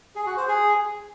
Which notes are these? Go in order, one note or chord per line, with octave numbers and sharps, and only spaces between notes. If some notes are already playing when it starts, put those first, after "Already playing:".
G#4
F#4
C5
G#4